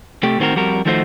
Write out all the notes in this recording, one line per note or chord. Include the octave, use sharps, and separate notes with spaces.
C3 A3 G4
A2 D#3 C4 F#4 A#4
F2 G3 F#4 A#4
D#3 F3 A3 D#4 F#4 C5